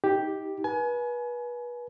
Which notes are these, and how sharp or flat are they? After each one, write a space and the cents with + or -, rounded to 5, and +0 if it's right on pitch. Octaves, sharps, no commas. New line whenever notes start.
D#4 +30 G4 +0
B4 -30 G#5 +30